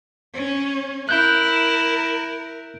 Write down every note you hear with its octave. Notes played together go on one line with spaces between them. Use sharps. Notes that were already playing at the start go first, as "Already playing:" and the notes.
C#4
E4 A#4 F#6 G6